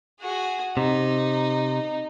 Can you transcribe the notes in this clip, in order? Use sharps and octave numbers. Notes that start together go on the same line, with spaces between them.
F#4 G#4
C3 D#4